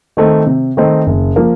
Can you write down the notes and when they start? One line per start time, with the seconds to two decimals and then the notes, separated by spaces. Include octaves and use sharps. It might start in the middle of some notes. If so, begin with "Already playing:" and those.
0.17 D#3 A3 C4 D#4
0.47 C3
0.77 D#3 A3 C4 D#4
1.06 F#1
1.36 F3 A#3